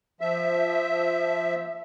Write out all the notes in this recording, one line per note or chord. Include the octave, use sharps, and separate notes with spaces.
F3 E5